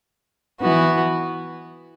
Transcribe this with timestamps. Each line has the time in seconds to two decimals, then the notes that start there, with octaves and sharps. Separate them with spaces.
0.61 E3 B3 F#4